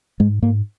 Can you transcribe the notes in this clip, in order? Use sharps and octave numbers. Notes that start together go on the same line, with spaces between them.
G#2 G#3
G#2 A#3